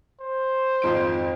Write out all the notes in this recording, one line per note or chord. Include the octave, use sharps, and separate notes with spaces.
C5
G#1 F2 D7